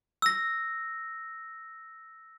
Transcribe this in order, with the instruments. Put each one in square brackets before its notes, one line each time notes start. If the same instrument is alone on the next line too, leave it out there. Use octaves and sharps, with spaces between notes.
[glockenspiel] E6 A#6